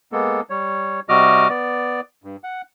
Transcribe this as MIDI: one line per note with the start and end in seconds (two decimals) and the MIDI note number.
0.12 0.41 56
0.12 0.41 58
0.12 0.41 59
0.12 0.41 69
0.50 1.00 55
0.50 1.00 73
1.09 1.48 48
1.09 1.48 55
1.09 1.48 66
1.09 1.48 75
1.09 1.48 86
1.09 1.48 89
1.49 2.01 59
1.49 2.01 74
2.24 2.36 43
2.44 2.62 78